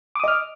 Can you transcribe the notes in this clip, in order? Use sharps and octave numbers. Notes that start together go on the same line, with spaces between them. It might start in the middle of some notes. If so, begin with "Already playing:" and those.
D#5 D6 D#6 F6